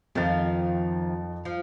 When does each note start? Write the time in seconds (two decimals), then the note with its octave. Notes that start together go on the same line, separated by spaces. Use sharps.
0.15 F2 D#3 F3 D#5 A6
1.45 F3